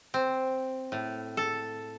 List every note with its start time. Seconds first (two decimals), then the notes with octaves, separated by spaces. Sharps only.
0.14 C4
0.92 A2
1.37 A4